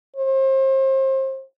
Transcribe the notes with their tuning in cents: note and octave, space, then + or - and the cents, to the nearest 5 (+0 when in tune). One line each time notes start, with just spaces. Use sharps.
C5 +35